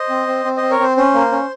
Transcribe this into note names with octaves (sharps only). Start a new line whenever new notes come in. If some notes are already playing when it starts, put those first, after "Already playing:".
Already playing: C5 D#5
C4
C4
C4
C4 C5 D#5
A#4 C#5
C4 C5
C#4 C5
A#3
C#4